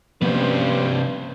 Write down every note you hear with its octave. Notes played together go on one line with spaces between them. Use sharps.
G2 C3 F3 A#3 B3 C#4 B4 C5